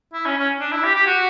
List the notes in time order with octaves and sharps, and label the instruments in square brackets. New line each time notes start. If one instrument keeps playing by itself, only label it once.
[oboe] E4
C#4
C#4
D4
E4
G4
G4
F#4